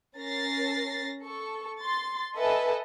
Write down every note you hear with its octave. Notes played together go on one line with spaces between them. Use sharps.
C#4 A#4 A6 A#6 C7
A4 C#6
C6 A6
A4 B4 D#5 E5 G#5 A5